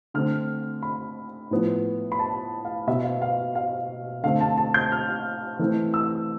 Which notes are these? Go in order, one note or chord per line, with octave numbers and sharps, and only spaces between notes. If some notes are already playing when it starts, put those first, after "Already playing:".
D3 A3 C4 F6
B5
A2 F3 B3
B5
A5
F5
B2 B3 E5
F5
F5
F5
D3 A3 C4 F5
A5
A5
G6
F6
E3 A3 C4
E6